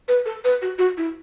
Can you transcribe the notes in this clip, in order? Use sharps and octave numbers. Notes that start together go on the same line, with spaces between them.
B4
A4
B4
F#4
F#4
E4